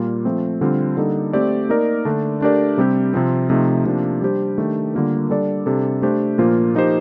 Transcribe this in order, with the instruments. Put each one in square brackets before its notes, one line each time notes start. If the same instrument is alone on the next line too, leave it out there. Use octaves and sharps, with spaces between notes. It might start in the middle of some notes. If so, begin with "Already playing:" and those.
Already playing: [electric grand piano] A#2 G3 A#3 F4
F3 A3 C4
D3 G3 C4 F4
D3 G3 A#3 D#4 A4
A3 C4 G4 D5
A#3 D#4 A#4 D5
D3 A3 D4
A3 D4 G4 A#4 D5
C3 G3 C4 G4
C3 F3 C4
C3 F3 A3 D#4
C3 F3 A#3 D4
G3 D4 G4 C5
D#3 A3 D4 G4
D3 G3 A#3 F4 A#4
G3 D4 A4 D5
C3 G3 D4 A4
A3 D4 G4 C5
A#2 F3 A#3 F4 C5
F3 A#3 D#4 G4 C5